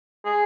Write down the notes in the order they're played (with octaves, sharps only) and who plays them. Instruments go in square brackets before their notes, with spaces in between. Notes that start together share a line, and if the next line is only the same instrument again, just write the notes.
[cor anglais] G#4